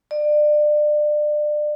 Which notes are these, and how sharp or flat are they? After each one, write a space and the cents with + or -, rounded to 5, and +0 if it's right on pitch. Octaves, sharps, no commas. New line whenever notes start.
D5 +30